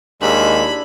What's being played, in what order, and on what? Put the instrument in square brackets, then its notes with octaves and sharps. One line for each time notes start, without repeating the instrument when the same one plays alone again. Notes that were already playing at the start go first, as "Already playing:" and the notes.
[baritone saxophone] D#2 [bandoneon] G#3 [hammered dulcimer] D4 E4 [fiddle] B5